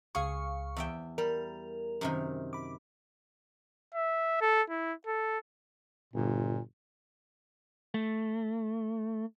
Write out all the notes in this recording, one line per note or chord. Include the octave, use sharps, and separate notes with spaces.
C#2 G#4 F5 G#5 C#6
E2 E5 G5
G3 A#4
F#2 C3 D#3
B5 D6
E5
A4
E4
A4
G1 A#2
A3